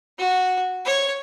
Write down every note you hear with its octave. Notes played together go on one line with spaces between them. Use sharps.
F#4
C#5